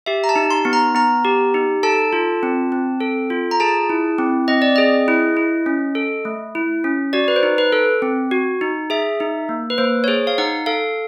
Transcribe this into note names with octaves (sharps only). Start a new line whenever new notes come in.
G4 E5
A#5
A5
D#4
C6
B3
A#5
B3 A#5
G4
D#4
A4 A5
F4
C4
C4
A4
F4
A#5
G#4 A5
E4
C4
C4 D#5
D5
G#4 D#5
E4
E4
C#4
A4
A3
E4
C#4
F#4 D5
B4
C5
D#4
B4
A4
C4
F#4
D#4
G#4 E5
D#4
A#3
B4
A#3 C5
C#5
G#4 C5
F5
D#4 F#5
A4 F5